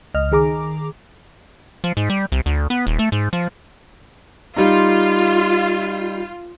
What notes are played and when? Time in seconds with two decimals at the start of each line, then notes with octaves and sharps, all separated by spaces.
0.14 C#2 D#5 F6
0.32 D#3 G#4 A#5 D6
1.84 F3
1.97 G#2
2.10 G3
2.32 C2
2.46 D2
2.70 B3
2.87 D#1
2.99 A3
3.12 G#2
3.33 F3
4.56 G3 D#4 F4